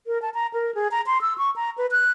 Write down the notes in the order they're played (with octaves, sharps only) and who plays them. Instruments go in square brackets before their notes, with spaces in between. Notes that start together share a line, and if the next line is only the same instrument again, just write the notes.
[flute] A#4
A5
A#5
A#4
G#4
A#5
C6
E6
C#6
A#5
B4
F#6